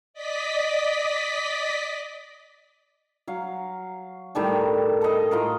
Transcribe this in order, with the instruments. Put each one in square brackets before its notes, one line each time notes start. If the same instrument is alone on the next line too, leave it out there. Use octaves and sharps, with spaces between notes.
[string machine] D5 D#5 B6
[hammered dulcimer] F#3 F5
A2 D#3 G3 A5
A4 D#5
A2 F4 A#4